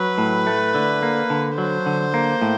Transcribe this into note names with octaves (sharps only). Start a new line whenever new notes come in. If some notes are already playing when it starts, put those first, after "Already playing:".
Already playing: F#3 B4
A2
A3
D3
A#3
D3
F#3 C5
D3
A#3
A2